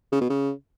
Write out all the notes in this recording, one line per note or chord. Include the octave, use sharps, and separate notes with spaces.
C#3
B2
C#3